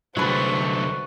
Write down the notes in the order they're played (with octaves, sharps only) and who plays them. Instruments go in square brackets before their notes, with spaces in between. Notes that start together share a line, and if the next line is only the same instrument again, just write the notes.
[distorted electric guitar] C2 D3 [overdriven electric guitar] F#3 A3 [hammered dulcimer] F#4 B4 [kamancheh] C5 C#6